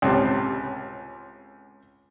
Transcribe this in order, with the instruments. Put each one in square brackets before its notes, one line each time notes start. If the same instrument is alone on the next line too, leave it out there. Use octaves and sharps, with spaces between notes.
[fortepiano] C#2 A2 C3